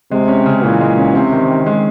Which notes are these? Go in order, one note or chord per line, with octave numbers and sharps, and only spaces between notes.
C3 G#3
C#4
C#3
A#2 E3
G#3
C#4
C3 C4
D#3
D#3
G#3